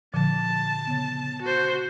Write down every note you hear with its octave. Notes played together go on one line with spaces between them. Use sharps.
A#2 D3 F3 A5
C#3 B3
F#4 C5